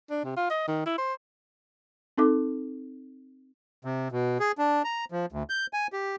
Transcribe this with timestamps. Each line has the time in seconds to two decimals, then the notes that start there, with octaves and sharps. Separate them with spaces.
0.10 D4
0.24 C3
0.37 F4
0.50 D#5
0.68 D#3
0.86 E4
0.98 C5
2.18 C4 D#4 A4 D6
3.85 C3
4.12 B2
4.40 G#4
4.58 D4
4.85 A#5
5.12 F3
5.32 D2
5.50 G6
5.73 G#5
5.93 G4